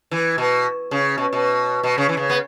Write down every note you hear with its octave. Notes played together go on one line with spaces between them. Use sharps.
E3
B2
C#3
B2
B2
B2
C#3
E3
C#3
B3